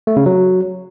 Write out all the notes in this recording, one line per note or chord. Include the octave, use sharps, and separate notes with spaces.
A3
C#3
F#3